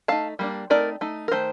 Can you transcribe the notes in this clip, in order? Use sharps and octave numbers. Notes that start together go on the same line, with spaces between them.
A3 D#4 F5 A5
G3 A#3 D4
A3 C4 D#4 A#4 D5
A3 D#4
A#4
D#3 A3 C5